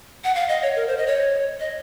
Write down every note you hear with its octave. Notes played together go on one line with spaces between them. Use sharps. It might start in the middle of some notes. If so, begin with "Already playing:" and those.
F#5
F5
D#5
C#5
A#4
C5
D#5
C#5
D#5